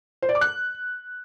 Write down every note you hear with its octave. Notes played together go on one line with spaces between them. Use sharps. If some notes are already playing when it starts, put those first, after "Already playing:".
C5
D5
D6
F#6